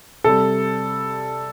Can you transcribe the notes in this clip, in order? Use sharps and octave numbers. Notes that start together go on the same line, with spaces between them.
C3 G3 A4